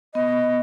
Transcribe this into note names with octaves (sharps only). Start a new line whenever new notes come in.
B3 D#5